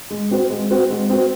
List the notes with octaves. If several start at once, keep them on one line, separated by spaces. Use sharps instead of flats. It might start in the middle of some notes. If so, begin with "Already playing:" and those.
G#3
C4 F#4 C5
G#3
C4 F#4 C5
G#3
C4 F#4 C5